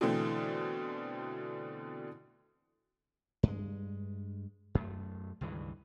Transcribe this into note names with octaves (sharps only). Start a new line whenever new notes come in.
B2 D3 E3 A3 C4
G2 G#3
F#2 A3
C#2 G2 D#3 E3